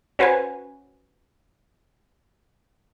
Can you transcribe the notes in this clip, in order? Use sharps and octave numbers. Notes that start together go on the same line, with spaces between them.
C#4 F#4 B4 C5 G#5